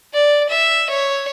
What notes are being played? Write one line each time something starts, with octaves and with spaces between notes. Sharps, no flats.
D5
E5
C#5